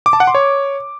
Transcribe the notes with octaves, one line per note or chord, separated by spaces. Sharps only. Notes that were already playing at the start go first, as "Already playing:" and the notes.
D6
A5
F#5
C6
C#5